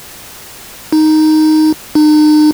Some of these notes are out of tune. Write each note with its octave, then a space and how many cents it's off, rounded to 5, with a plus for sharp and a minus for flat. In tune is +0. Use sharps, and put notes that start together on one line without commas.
D#4 +0
D#4 -40